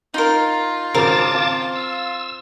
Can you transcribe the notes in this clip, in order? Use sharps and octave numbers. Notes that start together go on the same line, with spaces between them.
D#4 F4 A#4
G#1 C#3 A#4 C5 A5 D6 A6
C4 F5
E6